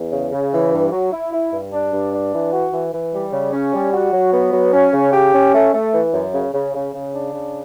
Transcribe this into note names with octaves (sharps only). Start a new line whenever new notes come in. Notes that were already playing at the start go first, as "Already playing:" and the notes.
Already playing: E2
C#3
C#3
E3
G2
F#3
E4
E4
G2
D4
G2
D4
E3
F#4
E3
E3
G3
C#3
C#4
G3
F#4
F#3
B3
F#3
C#4
C#3
G4
C#4
A3
A3
E3
F#2
C#3
C#3
C#3
C#3
D4
C#3